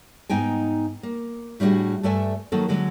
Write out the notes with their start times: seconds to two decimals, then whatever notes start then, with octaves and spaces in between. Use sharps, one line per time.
0.29 G#2 B3 D#4 G5 G#5
1.03 A#3
1.60 A2 G3 D4 D#4 F#4 G#4
2.03 G2 A3 A4 D5 E5 G#5
2.52 D#3 F#3 A#3 D#4 A4
2.68 D3 F#3 G#3